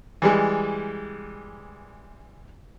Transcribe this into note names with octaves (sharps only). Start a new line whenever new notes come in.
E3 G3 G#3